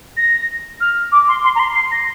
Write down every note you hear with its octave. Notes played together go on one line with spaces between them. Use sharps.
A#6
F6
D6
C6
C6
A#5
C6
C7
A#6